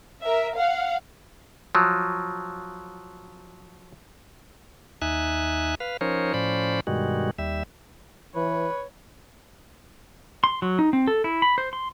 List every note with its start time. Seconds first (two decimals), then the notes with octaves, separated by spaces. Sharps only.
0.23 A#4 E5
0.56 F5 F#5
1.75 F3 F#3
5.02 D#2 D#4 E5 G#5 F#6
5.80 B4 F5
6.01 F3 C#4 D#4 A#4 C5 C#5
6.34 A2 F3 C#4 C5 D5 B5
6.87 G2 B2 D#3 G3 G#3 F#4
7.38 D#2 G3 E5
8.35 E3 B4 C#5
10.44 C6
10.62 F#3
10.79 D#4
10.93 C4
11.07 A4
11.24 E4
11.42 B5
11.58 C5
11.73 C6